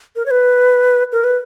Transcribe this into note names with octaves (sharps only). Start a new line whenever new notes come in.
A#4
C#5
B4
A#4
B4